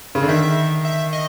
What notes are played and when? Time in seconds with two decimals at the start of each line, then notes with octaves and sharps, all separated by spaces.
0.15 C#3
0.22 D3
0.28 D#3 E5
0.85 E5
1.13 D#5